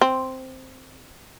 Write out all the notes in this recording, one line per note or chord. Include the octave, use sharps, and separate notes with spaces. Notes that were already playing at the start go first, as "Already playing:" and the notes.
C4